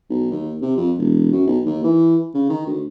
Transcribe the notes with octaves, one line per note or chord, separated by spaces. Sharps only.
B1
D#2
C3
F2
E1
F#2
B1
D#2
E3
C#3
D#3
D2